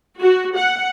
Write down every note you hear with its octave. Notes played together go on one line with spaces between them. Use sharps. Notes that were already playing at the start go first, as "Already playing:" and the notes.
F#4
F#5